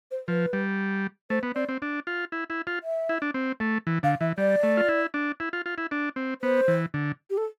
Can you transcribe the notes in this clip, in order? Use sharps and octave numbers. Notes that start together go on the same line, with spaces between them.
C5
F3 B4
G3
A3 C5
B3
C4 D5
C4
D4
F4
E4
E4
F4
E5
E4
D4
C4
A3
E3
D3 F5
E3 E5
G3 D5
A3
F4
E4
D4
E4
F4
F4
E4
D4
C4
B3 C5
E3
D3
G4
A4